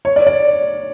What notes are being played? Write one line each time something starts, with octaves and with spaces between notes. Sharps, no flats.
C#5
D5
D5